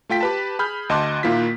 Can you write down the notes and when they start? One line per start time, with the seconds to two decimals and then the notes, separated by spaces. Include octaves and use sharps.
0.09 A3 F4 G5 B6
0.21 G4 B4 A5
0.59 G#4 B5 F6 G6
0.89 D2 D#5 A5 C6 D6 F#6
1.23 A#2 D#3 A#3 E4 F4 B6